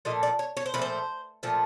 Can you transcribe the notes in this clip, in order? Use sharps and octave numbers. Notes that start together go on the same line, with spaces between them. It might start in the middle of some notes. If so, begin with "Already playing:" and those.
A#2 F3 A3 D#5
D5
C#5
C#5
C5
A#2 F3 A3 B4
C5
A#2 F3 A3